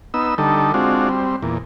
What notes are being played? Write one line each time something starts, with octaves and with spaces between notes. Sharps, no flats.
B3 D#4 E6
D3 G3 D#4 A4
G#3 C4 D4 F4 F#4
G3 C4
E2 A#2